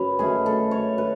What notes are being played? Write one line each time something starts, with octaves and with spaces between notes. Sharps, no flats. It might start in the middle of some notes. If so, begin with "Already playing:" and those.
Already playing: F#2 C#3 B4 C#5
D#3 A3 C#4 G#4
A4
C#5
B4